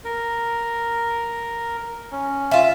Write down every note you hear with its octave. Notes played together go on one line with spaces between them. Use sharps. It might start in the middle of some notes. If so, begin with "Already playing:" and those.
A#4
C#4
F4 E5